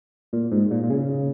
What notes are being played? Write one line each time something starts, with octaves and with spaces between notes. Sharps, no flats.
A#2
G#2
A#2
A#2
C#3